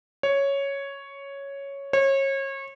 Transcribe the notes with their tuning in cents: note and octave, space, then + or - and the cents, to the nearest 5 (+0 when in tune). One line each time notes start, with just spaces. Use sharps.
C#5 +0
C#5 -30